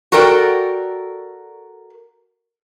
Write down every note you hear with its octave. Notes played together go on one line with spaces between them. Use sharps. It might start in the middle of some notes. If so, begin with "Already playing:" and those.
F#4 A4 A#4 D5 G5